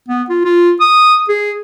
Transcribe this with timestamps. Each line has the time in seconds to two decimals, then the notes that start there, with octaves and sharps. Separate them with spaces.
0.08 B3
0.29 F4
0.45 F4
0.81 D#6
1.29 G#4